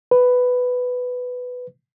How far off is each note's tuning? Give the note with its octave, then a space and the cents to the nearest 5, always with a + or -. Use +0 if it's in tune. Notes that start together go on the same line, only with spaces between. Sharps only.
B4 +10